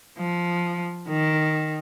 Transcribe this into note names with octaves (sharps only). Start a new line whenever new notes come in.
F3
D#3